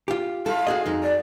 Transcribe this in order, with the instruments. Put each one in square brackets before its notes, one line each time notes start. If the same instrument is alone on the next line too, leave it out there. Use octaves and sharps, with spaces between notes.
[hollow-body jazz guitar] F4 G4
[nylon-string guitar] E4 A4 [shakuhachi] F5
[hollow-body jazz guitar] F#4 G#4 D#5
[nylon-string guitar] F2 D#4
[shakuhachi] D5